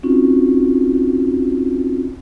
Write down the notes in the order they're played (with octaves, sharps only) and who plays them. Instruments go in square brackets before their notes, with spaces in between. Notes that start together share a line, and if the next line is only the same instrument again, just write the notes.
[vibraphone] C4 C#4 D#4 F4 F#4